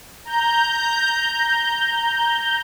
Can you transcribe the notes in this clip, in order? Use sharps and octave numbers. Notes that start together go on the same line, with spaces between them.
A#5 G6